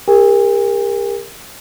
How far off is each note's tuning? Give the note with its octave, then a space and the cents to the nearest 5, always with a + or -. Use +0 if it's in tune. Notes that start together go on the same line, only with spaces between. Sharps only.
G4 +45 A#4 +0 G#5 -45